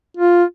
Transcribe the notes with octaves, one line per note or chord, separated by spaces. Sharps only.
F4